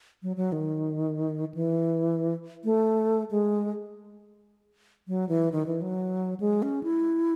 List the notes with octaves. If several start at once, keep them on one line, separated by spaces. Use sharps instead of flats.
F#3
F#3
D#3
E3
A3
G#3
F#3
E3
D#3
E3
F#3
G#3
C#4
E4